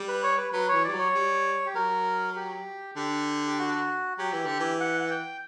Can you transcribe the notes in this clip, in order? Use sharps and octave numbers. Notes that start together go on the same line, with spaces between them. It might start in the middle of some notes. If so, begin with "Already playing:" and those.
Already playing: G3
B4
C#5
B4
F#3 B4
E3 C#5
G3 D5
F#3 C#5
G3
G4
F#3 A#4
G4
D3 G4
G4
F#4
F#3 G4
E3
D3
E3
F#5
F#5
G5